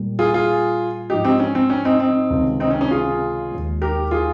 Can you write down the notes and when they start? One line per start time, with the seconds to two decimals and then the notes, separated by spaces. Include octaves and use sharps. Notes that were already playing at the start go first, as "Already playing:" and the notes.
Already playing: A#2 G3 A#3
0.19 F4 G#4
0.34 F4 G#4
1.09 G#2 F3 G#3 D#4 G4
1.25 C4 D#4
1.40 C#4
1.55 C4
1.70 C#4
1.85 C4 D#4
2.00 C4 D#4
2.30 C#2 C3 D#3
2.60 C4 D#4
2.71 C#4
2.81 C#4
2.91 F4 G#4
3.51 D#2 D#3 G#3
3.82 G4 A#4
4.11 F4 G#4